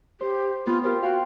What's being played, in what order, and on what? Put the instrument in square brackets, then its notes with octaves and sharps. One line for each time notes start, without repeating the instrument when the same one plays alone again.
[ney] G4 [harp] C5
[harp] B3 C4 [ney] F4
[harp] F4 G4 C5 [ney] A#4
[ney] F#4 [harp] F5 G5 C6